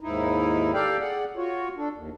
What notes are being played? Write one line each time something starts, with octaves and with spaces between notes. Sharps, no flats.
D#2 G#2 D#4 E4
G4 A4 D5 F5 G5
G#4 D5 F#5
F4 F#4 C#5
D4 A4
D#2